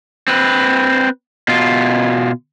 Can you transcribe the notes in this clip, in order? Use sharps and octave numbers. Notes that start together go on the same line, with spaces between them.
C4 B4
B2 F4